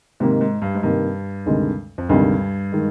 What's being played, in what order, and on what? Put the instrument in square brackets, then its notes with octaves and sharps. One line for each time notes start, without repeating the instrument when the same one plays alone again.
[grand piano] G#2 [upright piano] C3 D#3 A#3
[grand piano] G#2
G2
G#2
[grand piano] G2 [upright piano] C3 D#3 A#3
[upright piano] D2 C3 D#3 G#3
[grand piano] F2
[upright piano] D2 C3 D#3 G#3 [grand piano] G2
[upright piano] D#3 G#3